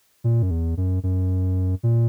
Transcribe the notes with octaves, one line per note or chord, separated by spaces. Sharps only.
A#2
F#2
E2
F#2
F#2
A#2